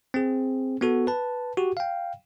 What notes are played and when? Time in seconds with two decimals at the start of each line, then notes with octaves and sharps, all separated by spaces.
0.14 C4 G#4
0.81 B3 F#4 A4
1.07 B4 A5
1.57 F#4 G4
1.77 F5 G5